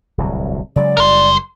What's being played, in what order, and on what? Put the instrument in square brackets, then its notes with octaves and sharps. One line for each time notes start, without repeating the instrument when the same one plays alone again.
[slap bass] D1 C2 F#3
[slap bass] C#3 F#3 G#3 [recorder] D5
[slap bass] F#1 G3 [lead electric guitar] A#4 C6